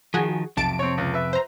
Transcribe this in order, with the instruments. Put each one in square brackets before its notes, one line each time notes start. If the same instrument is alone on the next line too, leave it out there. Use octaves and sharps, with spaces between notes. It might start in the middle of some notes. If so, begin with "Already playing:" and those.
[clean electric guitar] D#3 F3 [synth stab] F#4 G#4
[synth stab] B1 A5 D7 [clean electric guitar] F2 C3
[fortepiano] C4 C#5
C#2
B4 E5
[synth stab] C5 A#5